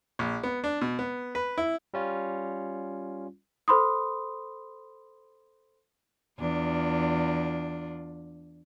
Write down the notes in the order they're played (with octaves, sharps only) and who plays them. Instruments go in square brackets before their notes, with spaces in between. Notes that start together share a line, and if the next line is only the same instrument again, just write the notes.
[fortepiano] A#1
B3
D4
B2
B3
B4
E4
[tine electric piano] G3 C#4 F4
[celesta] A4 C5 B5 C6 D#6
[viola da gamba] E2 D4 F4